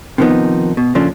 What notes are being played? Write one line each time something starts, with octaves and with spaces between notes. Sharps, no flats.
C3 D#3 F3 B3 D#4
B2
A#2 C#3 F3 A3 C#4 D4